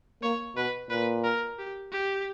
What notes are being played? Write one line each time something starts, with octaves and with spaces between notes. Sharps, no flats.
A#3 C#5
B2 B4
A#2 B4
A#4
G4
G4